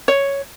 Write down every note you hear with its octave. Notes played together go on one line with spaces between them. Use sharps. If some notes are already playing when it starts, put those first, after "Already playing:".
C#5